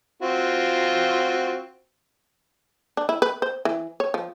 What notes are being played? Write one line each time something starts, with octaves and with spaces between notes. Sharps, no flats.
C4 F4 F#4
D4
E4
B4
C5
E3
C#5
F3